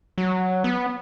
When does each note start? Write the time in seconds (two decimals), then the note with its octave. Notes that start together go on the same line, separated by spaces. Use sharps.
0.18 F#3
0.64 B3